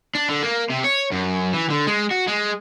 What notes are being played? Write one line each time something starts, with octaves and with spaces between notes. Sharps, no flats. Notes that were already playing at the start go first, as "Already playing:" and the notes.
D4
D3
A#3
C3
C#5
F#2
E3
D3
G#3
F#4
G#3